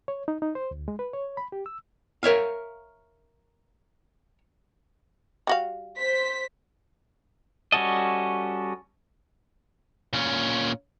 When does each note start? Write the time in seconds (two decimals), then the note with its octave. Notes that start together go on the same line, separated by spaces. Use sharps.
0.08 C#5
0.28 D#4
0.42 D#4
0.55 C5
0.71 D2
0.88 G#3
0.99 B4
1.14 C#5
1.37 B5
1.52 G4
1.66 E6
2.23 A#4 C#5 E5 F5
5.47 G3 F#4 F5
5.97 C5 B6
7.72 G3 C#4 F#4 A4 D#5
10.13 A#2 C#4